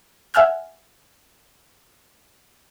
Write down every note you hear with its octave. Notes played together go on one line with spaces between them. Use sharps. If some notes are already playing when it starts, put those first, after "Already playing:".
E5 F#5 G#5 E6 F6 G6